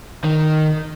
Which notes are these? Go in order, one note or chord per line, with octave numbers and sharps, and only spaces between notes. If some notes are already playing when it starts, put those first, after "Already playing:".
D#3